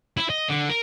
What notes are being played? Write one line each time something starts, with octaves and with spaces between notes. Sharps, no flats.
E4
D#5
D3
A#4